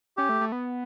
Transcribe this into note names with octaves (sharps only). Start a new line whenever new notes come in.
C#4 G4
A3
A3
B3